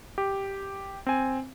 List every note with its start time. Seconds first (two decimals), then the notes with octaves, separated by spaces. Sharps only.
0.18 G4
1.07 C4 G#5